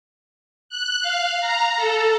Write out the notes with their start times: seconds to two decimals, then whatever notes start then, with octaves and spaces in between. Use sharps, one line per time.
0.69 F#6
1.02 F5
1.40 A#5
1.76 A4